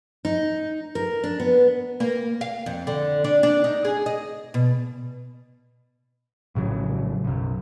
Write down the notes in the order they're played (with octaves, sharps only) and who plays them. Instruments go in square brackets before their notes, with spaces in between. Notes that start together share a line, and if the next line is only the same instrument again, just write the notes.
[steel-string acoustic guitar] D#4
A#4
D4
B3
[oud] A#3
F5
F2
D3
D4
D4
D#4
G#4
D#5
B2
[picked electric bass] A#1 A2 C#3 F#3
B1 F#2